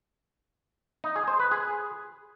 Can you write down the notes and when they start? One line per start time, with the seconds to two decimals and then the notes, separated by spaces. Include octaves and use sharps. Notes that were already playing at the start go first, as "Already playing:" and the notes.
1.04 D#4
1.16 G#4
1.28 C5
1.40 B4
1.51 G#4